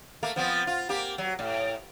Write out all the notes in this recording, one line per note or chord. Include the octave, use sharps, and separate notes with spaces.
A3 A#3
F3 B3 C4
F4
A#3 G4
F#3
A2